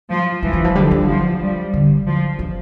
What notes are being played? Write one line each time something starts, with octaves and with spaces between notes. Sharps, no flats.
F3
E3 G3
E3
F3
D3 G3
E3
F3
G3
D3
F3
E3